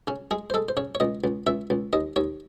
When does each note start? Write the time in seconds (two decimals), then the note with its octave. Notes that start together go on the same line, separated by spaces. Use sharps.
0.07 C#3 C#4
0.31 G#3 G#4
0.50 C5
0.54 G#3 A4
0.69 C5
0.77 C#3 C#5
0.95 C#5
1.00 C#2 D#5
1.24 C#2
1.47 C#2 E5
1.70 C#2
1.93 D#2 D#5
2.16 D#2 C#5